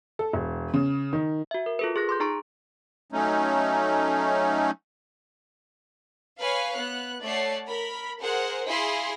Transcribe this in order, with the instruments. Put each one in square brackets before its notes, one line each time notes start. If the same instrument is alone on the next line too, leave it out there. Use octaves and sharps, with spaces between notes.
[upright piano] A4
E1
C#3
D#3
[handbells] F#4 E5
A#4
F4 A4 B4
G#4 D6 F#6 A#6
C6 D6 G6
D#4 G#4 A#5 C#6 D7
[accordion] F#3 A3 C#4 D#4
[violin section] B4 C#5 F5 G#5
B3 F#6
A3 C#5 D5 F#5 A5 C7
A#4 B5
G#4 A#4 C5 F#5
E4 G#4 F5 G#5 C6 A#6